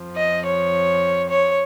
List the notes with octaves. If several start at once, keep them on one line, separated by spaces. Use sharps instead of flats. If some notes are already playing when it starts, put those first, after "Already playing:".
Already playing: F2 F3
D#5
C#5
C#5